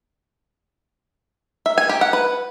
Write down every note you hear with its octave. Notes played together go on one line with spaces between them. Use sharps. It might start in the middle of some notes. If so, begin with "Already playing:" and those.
E5
G#5
G4
F#5
B4